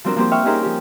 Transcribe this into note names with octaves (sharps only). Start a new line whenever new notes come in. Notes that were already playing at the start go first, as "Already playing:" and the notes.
F3 G3 C4 D4 F#4 A#4
F3 A#3 C4 G4 C5
E5 F5 G5 C#6 F6
C#4 D#4 G4 G#4 A#4 C5
F3 G4